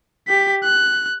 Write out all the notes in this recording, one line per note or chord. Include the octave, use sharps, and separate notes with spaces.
G4 B6
F#6